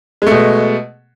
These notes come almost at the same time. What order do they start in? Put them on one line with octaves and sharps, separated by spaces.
G#3 A3 B2